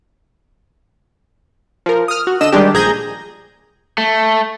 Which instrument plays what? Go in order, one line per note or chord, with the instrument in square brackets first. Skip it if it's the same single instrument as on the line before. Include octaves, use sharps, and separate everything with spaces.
[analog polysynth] F3 A#4
D#6 F6
F#4
D3 D#5 E6 E7
D#3 G3 G#3 D4 G4
A#1 G#4 A#5 G6 G#6 A#6
[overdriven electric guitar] A3